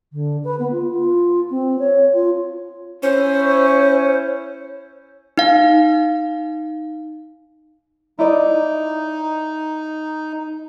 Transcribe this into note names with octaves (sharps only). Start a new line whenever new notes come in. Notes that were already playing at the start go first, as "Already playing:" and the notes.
D3
B4
B3
F4
F4
C4
C#5
F4
C#4 E4 C5 C#5
D#4 F5
D#4 E4 D5 D#5